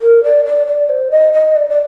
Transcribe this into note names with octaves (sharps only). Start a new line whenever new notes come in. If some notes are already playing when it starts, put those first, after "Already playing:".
A#4
D5
D5
D5
C5
D#5
D#5
D5
D5